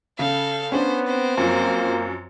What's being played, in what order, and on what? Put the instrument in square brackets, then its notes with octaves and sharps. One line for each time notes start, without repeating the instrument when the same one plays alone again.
[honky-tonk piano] C#3 [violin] A4 F5
[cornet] B3 [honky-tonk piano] C#4 D4 [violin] C5
[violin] C4 C5
[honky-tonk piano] F#2 F3 [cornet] A#3